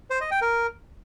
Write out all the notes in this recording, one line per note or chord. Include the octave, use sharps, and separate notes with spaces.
C5
D#5
G5
A#4